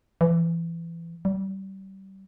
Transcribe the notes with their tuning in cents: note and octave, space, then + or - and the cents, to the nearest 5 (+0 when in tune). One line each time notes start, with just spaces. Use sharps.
E3 +25
G3 -30